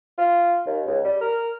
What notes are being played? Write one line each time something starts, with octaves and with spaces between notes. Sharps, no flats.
F4
D#2
C#2
G3
A#4